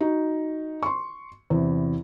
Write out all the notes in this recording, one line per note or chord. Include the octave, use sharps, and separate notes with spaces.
D#4 F#4
C6 C#6
E2 C3 E3